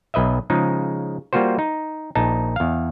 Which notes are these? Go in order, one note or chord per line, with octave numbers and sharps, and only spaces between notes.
B1 B4 D#5 E5
C#3 F3 G#3 D#4
G3 A#3 F4 F#4 C5
D#4
A#1 D#4 A5
E2 F5